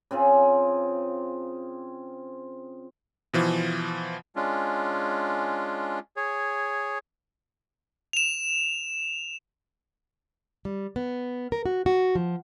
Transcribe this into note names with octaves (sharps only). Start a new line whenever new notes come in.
C#3 C4 F4 G#4
B2 E3 F3
G#3 C#4 D4 F4
G#4 C#5
E7 F7
G3
B3
A#4
F#4
F#4
F3